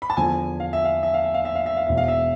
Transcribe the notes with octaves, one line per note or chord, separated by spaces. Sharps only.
B5
A5
E2 D3 F3 G#5
F5
E5
F5
E5
F5
E5
F5
E5
F5
E5
F5
E1 E2 B2 E5
F5
E5